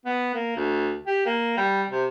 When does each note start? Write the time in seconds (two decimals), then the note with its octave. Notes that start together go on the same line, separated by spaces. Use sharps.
0.05 B3
0.34 A#3
0.56 D2
1.07 G4
1.25 A#3
1.57 G3
1.90 C3